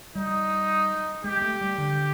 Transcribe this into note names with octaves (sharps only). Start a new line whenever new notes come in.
G3 D#4
G#3 G4
A3
G3
D3